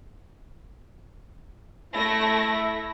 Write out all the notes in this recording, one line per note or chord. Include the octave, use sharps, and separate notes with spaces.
A3 E4 A#6